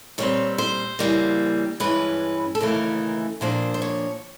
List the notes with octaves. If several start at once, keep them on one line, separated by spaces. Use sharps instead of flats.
A#2 G3 C4 C#5
C5
C#3 E3 G3 A#3
G2 E3 G#3 C#4 B4
A4
D#2 C#3 E3 A3 A#4
A#2 F3 A#3 D4 C5
C5
C#5